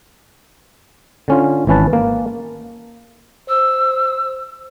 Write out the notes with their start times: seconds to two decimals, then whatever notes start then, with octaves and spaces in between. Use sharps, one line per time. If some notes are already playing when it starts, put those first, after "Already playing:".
1.28 D3 C#4 F4
1.67 G#1 E3 C#4 B4 A5
1.93 A#3
3.48 C5 E6